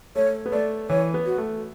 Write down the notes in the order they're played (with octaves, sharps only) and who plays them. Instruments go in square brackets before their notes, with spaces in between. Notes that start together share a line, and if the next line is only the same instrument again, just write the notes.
[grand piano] A3 [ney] C#5
[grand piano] B3
[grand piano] A3 [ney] D5
[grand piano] E3 [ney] C#5
[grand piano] B3
[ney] F#4
[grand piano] A3